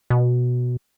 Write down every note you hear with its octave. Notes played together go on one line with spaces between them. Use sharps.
B2